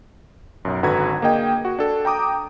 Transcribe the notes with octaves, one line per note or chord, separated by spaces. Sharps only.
B1 F#2
G#1 D3 F#4 B4 A#5 G#6
A#3 D4 G#4 D#5 G5
F#4
D4 A4
G5 A#5 D6 D#6